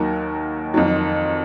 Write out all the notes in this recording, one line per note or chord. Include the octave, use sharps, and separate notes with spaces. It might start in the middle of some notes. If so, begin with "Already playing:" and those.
Already playing: D#2 D#3 F#3 A#4
F2 D#3 F#3